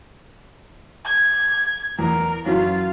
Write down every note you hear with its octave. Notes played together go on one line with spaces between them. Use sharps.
G#6
E2 A#4
F#2 E3 F#3 F4